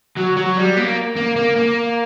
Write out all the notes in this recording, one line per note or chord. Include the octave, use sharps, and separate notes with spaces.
F#3
F#3
G3
A#3
A#3
A#3
A#3